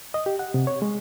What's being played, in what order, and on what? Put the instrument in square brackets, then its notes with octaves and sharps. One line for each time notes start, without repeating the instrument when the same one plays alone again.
[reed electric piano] D#5
G4
F#5
C3
C#5
G#3